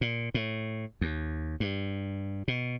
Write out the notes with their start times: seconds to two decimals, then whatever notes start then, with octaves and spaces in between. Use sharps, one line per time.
0.01 A#2
0.34 A2
1.01 D#2
1.60 G2
2.48 B2